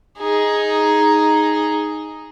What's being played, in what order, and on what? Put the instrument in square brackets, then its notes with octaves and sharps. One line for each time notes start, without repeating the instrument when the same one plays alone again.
[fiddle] D#4 G#4